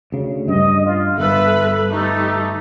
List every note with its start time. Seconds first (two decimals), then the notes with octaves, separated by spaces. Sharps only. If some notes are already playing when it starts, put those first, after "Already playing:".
0.12 D2 C#3
0.48 G2 D#5
0.85 F4
1.18 G1 A4 B4 E5
1.89 A3 D#4 G4